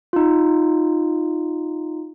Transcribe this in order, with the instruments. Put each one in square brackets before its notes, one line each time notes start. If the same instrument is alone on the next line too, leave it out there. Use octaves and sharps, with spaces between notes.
[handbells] D#4 F4